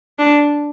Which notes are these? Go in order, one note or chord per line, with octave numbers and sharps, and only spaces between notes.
D4